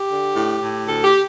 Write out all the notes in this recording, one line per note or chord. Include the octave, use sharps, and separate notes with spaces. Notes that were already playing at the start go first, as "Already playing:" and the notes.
Already playing: G4
D3
A2
A2
D2 A4
G4